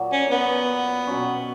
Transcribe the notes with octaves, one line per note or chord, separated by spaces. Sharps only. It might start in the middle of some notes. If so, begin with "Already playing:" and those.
Already playing: A#2 F#3 A#3
C#4
B3
B2 F#3 C#4